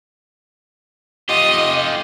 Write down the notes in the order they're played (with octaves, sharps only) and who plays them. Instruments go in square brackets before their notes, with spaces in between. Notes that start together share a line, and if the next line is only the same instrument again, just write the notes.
[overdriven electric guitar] F4 G4 [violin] D#5